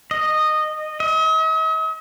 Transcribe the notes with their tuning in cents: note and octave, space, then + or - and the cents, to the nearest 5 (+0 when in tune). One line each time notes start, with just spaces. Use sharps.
D#5 -15
D#5 +45